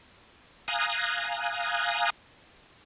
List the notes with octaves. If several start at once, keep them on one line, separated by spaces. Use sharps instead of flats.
F5 G#5 A#5 D#6 F#6